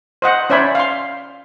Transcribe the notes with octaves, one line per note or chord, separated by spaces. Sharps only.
C5 D#5 F#5
C#4 C5 D5 E5 G#5 B5
F5 C6